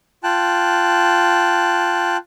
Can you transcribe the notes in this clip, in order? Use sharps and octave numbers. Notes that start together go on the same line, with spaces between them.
F4 G5 A5 F#6